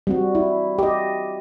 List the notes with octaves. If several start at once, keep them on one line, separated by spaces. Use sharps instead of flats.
G3 C4 F#4
E4
G4 D#5